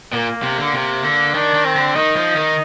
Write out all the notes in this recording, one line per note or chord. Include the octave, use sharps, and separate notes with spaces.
A#2 A#3
C3
D3
C3
D3
D#3 D4
D#3
C4
D3
D#3 D#4
F3
D#3